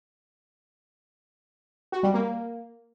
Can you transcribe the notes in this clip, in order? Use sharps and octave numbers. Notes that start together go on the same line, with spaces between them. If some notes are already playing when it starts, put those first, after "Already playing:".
F#4
G3
A#3